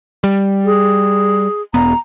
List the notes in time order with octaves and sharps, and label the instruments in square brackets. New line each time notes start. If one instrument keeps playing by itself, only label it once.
[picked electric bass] G3
[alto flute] G#4
[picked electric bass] E1 B3 [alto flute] A#5